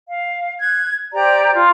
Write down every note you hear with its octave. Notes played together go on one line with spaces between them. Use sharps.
F5
F#6 G#6
G4 C5 D5 A#5
F4